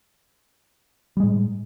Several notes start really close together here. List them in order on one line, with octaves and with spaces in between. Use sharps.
G3 G#3 A2